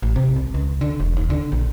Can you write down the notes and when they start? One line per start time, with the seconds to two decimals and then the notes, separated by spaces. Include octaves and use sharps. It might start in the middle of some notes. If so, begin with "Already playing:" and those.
0.02 A1
0.16 C3
0.36 C2
0.54 C#2
0.81 D3
1.00 E1
1.16 D#2
1.30 D3
1.52 A#1